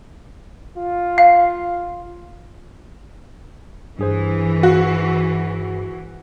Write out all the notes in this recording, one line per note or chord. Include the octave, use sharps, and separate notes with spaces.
F4
F5
G2 E3 G#4 C5
F#4